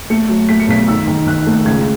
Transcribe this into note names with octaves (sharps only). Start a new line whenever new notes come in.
A3 C#7
F#3
A3 B6
C#7
B1 B6
D#3 E6
D#3
D#3 F#6
A3
C#2 G#6